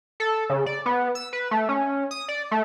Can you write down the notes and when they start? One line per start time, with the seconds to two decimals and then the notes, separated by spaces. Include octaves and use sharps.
0.20 A4
0.50 C#3
0.66 D5
0.86 B3
1.15 E6
1.33 B4
1.51 A3
1.69 C#4
2.11 D#6
2.29 D5
2.51 A3